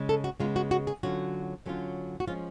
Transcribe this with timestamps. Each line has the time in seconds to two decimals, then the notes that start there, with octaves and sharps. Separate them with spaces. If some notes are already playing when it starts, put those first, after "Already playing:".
Already playing: C#3 G#3
0.09 A4
0.24 F#4
0.40 C#3 G#3 B3 F4
0.56 F#4
0.71 F#4
0.87 G#4
1.03 D3 F#3 C#4 F4 F#4
1.66 D3 F#3 C#4 F4
2.20 F#4
2.27 F3 G#3 C#4 F4